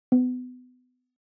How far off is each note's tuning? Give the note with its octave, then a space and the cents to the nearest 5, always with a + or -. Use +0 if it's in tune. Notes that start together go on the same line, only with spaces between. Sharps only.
B3 +30